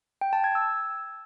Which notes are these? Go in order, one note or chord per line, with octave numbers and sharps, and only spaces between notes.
G5
A5
G#6
E6